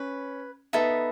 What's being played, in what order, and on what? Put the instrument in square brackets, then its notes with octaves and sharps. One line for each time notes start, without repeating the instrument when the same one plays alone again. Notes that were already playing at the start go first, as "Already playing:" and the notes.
Already playing: [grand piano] C#4 [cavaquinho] B4
[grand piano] B3 [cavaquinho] D#4 A4 E5 B5